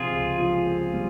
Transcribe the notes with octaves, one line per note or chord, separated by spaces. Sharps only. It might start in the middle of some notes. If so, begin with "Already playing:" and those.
Already playing: C3 F3 C4 F4 G#4
C#2
F3
C4
G3